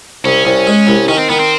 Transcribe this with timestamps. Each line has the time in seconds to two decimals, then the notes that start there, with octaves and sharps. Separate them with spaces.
0.24 C2 C#4
0.45 C2
0.67 G#3
0.87 C2
1.08 D#3 C#4
1.18 C4
1.29 D#3 B3
1.39 C4